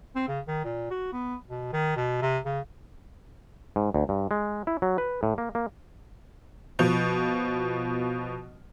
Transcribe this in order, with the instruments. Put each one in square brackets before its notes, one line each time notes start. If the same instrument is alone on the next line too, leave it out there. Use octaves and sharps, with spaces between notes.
[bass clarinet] C4
C#3
D#3
A#2
F#4
B3
B2
D#3
B2
C3
C#3
[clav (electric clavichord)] G#2
D2
G2
G#3
E4
F#3
B4
A2
A#3
A#3
[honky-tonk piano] B2 F3